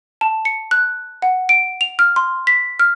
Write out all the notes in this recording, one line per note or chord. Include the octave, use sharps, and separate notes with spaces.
A5
C#7
F#6
F#5
D7
F7
F6
C6
B6
F6